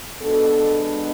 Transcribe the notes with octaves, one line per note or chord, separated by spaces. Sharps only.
B2 G#3 B3 D4 A4